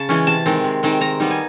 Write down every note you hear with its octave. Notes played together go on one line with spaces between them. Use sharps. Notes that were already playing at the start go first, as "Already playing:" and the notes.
Already playing: C#3 A5
E3 G#3 C#4
C3 A5
D#3 G#3 C4
C3
D#3 G#3 C4
D#3 A#5
G3 B3 D#4
G#5